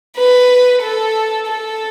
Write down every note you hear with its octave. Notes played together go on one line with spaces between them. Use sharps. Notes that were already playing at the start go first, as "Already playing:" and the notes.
B4
A4
A4